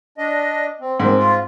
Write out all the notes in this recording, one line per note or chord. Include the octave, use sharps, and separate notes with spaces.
D4 D#5
C4
G#2 D#3 C4
F4